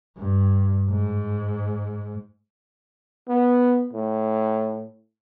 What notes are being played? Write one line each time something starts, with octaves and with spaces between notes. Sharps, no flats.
G2
G#2
B3
A2